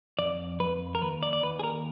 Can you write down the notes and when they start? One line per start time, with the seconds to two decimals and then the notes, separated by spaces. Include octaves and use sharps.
0.19 F2 D5
0.60 F2 B4
0.95 A#4
1.02 D#2 B4
1.23 D5
1.33 D5
1.43 D#2 B4
1.59 G#4
1.63 A#4